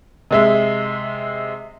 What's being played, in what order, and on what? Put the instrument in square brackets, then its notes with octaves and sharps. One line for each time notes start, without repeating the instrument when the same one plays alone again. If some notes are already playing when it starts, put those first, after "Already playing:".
[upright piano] C3 G#3 E5